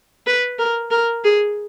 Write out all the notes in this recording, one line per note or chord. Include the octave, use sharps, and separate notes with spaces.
B4
A#4
A#4
G#4